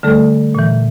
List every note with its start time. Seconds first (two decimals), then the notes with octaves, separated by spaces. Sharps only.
0.03 D3 G3 A3 A4
0.55 A#2 E3